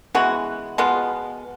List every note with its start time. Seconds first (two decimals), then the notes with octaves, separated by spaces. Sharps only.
0.15 E3 G#3 B3 F#4
0.78 B2 G#3 B3 F4